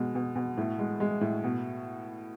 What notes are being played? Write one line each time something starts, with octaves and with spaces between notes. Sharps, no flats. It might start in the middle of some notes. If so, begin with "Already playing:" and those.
Already playing: B2 G#3
B2
B2
A2
G#3
G#3
A2
B2